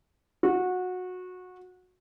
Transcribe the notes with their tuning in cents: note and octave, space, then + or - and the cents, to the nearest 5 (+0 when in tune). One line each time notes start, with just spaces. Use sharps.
F#4 -20